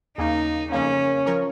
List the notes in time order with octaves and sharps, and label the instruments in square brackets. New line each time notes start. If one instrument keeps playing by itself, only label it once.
[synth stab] D#2 C#3 A#3 [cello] D#4
[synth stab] F2 C#3 A#3 [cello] C#4
[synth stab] F3 C#4 A#4 C#5